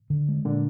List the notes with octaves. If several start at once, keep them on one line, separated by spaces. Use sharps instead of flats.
D3
G#3
A#2 D3 D4